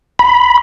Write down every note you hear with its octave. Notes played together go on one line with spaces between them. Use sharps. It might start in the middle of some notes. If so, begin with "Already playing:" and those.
B5